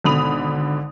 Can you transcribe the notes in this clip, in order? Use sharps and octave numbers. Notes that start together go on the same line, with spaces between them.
G#1 B2 D3 B5 D#6 F7